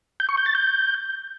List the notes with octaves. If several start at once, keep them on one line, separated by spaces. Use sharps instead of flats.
G6
C#6
G6
A6
G6